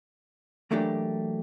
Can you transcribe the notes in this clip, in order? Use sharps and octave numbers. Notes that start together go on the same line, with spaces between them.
E3 F#3 A3 A#3 D4 G4